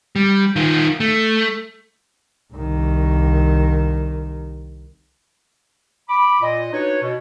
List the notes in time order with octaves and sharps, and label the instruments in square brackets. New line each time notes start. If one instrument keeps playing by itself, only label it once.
[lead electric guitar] G3
D#3 F4
A3
[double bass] C2 D#3
[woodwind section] B5 D6
A#2 D#5
D4 D#4 F#4 B4 C#5
B2